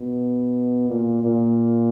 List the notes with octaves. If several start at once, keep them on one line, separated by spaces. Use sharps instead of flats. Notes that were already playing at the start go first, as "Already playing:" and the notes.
Already playing: B2
A#2
A#2